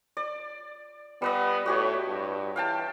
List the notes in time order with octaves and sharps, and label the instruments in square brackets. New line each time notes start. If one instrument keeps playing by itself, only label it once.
[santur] D5
[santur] G3 B4 D#5 [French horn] B3
[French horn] A2 [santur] F#4 G4 C#5
[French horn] G2
[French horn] E3 [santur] F5 G5 A5